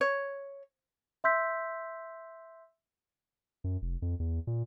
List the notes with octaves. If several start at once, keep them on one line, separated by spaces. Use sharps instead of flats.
C#5
E5 C6 E6 G6 B6
F#2
F1
F2
E2
A#2